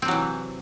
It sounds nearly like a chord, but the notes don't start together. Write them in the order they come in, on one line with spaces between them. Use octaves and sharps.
C4 C3 F#3 E3